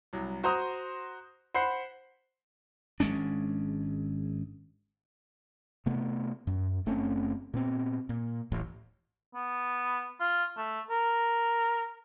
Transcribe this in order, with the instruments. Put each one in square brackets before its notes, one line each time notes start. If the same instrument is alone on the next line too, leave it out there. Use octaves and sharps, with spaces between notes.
[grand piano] C2 F#3
F#4 C5 A#5 C6 D#6
C5 F#5 B5 C7
[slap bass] G#1 G#3 C#4 D4
[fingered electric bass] C3 A3 B3
F#2
F#1 A3 C4 C#4
A#2 B3 C4
A#2
D1 A1 A2
[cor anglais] B3
F4
A3
A#4